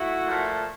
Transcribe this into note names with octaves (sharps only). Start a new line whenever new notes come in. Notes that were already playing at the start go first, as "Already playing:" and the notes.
Already playing: A3 E4 F#4
A#2 F3 A3